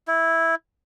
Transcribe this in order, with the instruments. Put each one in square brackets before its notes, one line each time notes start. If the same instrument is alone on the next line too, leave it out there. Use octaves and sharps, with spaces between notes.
[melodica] E4